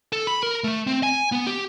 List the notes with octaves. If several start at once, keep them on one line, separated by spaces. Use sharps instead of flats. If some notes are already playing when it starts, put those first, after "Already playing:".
A4
B5
A#4
A3
C4
G#5
B3
G4